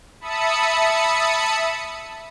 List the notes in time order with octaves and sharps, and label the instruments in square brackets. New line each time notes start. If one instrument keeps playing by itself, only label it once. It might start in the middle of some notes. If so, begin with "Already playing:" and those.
[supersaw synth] E5 A5 B5 D#6 C#7